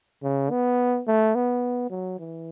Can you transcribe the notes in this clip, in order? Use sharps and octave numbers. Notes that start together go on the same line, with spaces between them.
C#3
B3
A3
B3
F#3
E3